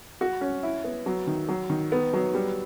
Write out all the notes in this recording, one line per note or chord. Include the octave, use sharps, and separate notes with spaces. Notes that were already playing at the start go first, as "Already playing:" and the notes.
F#4
C#4
E4
B3
F#3
D#3
F#3
D#3
B3
F#3
G3